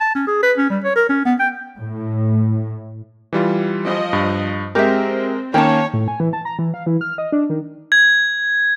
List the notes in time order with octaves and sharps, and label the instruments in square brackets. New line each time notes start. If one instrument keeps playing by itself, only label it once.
[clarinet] A5
C#4
G#4
B4
C#4
G3
C#5
A#4
C#4
B3
G5
[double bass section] A2
[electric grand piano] E3 G3 F4
[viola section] F3 D#5
[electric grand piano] G2
[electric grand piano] G#3 A#4 [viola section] C4 [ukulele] G4 E5
[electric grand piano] D#3 A#3 C#4 [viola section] C#5 [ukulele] G5 A5
[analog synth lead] A2
G#5
E3
A5
A#5
E3
F5
E3
F6
D#5
D4
D#3
[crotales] G#6